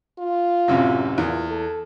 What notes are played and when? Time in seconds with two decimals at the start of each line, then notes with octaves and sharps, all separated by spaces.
0.19 F4
0.68 A1 F#2 C3
1.18 E2 A#2
1.50 A4